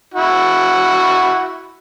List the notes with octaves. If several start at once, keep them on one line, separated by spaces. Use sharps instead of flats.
E4 F#4